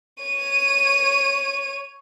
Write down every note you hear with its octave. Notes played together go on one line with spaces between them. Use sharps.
C#5 D#7